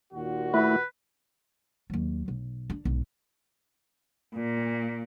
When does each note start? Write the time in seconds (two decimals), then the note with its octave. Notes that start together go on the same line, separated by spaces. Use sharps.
0.13 D#2 A#2 F#4
0.54 A3 E4 B4
1.90 D#2 F#3
2.28 B1
2.70 D4
2.85 B1 G#2
4.35 A#2